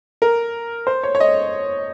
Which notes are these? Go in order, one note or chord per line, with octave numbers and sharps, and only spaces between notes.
A#4
C5
C#5
C#5
D#5